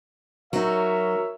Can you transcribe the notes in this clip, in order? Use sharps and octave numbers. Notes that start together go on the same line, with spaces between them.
F#3 D#4 A#4 C#5 E5